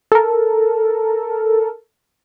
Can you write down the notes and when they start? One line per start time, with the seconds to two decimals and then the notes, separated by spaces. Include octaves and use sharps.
0.12 A4 A#4